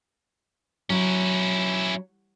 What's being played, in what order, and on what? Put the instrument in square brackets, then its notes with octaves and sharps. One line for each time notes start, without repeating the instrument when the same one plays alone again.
[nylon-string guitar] F#3 [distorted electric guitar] C#4 E4